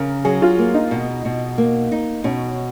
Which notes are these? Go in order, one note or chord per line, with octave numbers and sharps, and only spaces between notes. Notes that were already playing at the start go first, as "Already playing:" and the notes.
Already playing: C#3 A#4
F#3 G#4
F4
A#3
D#4
B2
B2
A#3
D#4
B2 C#4